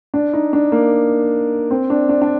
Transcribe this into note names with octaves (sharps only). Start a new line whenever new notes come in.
D4
D#4
D4
A#3
C4
D4
D4
D4